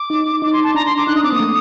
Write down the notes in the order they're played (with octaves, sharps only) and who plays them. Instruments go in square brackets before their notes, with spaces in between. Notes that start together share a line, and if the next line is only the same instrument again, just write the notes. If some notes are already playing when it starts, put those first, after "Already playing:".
Already playing: [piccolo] D6
[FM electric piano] D#4
[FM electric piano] D#4 [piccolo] D6
[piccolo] C6
A5
[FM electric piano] D4 [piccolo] A#5
[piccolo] C6
D6
[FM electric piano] D#4 [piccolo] F#6
[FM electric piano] D4 [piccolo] D#6
[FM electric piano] C4 [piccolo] D6
[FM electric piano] A#3 [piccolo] D#6
[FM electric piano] A3